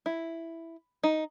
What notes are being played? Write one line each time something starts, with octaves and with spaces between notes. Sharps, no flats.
E4
D#4